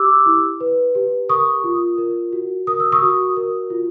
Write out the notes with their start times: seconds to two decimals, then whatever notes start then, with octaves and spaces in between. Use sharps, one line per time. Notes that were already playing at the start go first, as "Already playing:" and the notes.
Already playing: G4 D6 E6
0.26 E4
0.60 B4
0.95 G4
1.29 A#4 C#6 D#6
1.64 F4
1.98 A#4
2.33 F#4
2.67 A#4 D#6
2.80 E6
2.92 C#6 D#6
3.02 F#4
3.37 A#4
3.70 F4